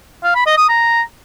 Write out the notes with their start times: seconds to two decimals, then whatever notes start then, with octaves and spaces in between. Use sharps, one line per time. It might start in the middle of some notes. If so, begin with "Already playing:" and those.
0.24 F5
0.35 B5
0.46 D#5
0.57 D#6
0.69 A#5